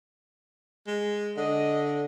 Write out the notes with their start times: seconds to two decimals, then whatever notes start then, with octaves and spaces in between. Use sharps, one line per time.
0.87 G#3
1.37 D3 D#5